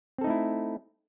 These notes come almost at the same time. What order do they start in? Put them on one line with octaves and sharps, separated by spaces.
C4 A4 D#4 A3 E4